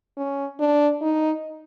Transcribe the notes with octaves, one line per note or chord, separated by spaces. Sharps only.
C#4
D4
D#4